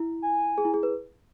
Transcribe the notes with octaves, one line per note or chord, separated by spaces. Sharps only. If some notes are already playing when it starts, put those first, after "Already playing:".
Already playing: E4
G#5
G#4
E4
G#4
B4